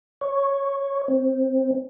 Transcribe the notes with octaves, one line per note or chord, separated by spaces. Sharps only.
C#5
C4